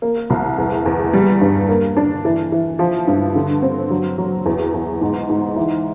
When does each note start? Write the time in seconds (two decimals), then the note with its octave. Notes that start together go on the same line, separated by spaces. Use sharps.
0.02 A#3
0.30 C2
0.58 E2
0.85 E2
1.13 G3
1.41 G2
1.69 A#3
1.97 D4
2.25 E3
2.52 E3
2.79 F3
3.07 G2
3.35 D3
3.62 C4
3.90 F#3
4.18 F#3
4.46 E2
4.74 E2
5.01 G#2
5.29 G#2
5.56 E3